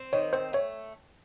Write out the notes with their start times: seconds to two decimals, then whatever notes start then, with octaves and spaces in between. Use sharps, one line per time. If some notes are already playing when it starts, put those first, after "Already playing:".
Already playing: C4
0.13 D#3 C#5
0.33 C4 C5
0.53 A3 C#5